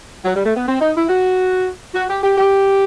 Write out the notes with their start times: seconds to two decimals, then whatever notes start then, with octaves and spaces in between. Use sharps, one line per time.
0.24 F#3
0.35 G3
0.46 A3
0.56 B3
0.67 C4
0.81 D#4
0.96 E4
1.09 F#4
1.94 F#4
2.09 G4
2.23 G4
2.38 G4